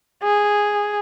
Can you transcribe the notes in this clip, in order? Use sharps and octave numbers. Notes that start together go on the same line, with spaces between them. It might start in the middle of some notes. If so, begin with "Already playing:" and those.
G#4